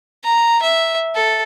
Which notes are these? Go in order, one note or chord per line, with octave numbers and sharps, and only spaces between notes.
A#5
E5
A4